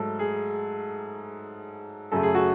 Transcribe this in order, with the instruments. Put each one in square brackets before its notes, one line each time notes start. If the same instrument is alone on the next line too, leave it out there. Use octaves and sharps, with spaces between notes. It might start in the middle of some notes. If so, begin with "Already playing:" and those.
Already playing: [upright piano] G#2 F#3 A3 A4
G#4
F#2 C#3 F#3 A3 A4
G#4
F#4